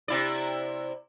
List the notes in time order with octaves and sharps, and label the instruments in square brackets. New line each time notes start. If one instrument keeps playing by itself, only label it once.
[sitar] C3 E4 D5